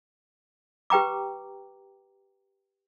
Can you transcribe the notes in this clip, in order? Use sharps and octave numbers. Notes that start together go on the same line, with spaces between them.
G4 B4 G5 A#5 D6